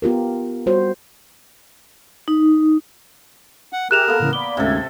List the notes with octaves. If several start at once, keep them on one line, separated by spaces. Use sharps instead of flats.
B3 F4 G4 A#4
G3 F#4 C5 C#5
D#4
F#5
G4 G#4 A#4 E5 F#6 E7 F7
A#3 B3 A4
A2 C#3 E3
D5 B5 D6 G7
D2 G#2 C3 C#4 A4 G#6